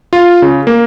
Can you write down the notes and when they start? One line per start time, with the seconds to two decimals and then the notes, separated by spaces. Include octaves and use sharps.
0.13 F4
0.42 C#3
0.67 A#3